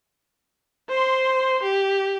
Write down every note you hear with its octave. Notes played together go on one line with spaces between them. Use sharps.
C5 C6
G4